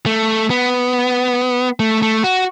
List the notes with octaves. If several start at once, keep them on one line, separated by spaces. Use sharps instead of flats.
A3
B3
A3
A3
F#4